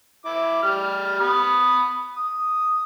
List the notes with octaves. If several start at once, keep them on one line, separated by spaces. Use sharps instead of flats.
E4 D6
G3 F6
B5 D#6
D#6